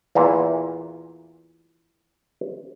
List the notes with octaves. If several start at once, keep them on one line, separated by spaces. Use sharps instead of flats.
E2 A#2 E3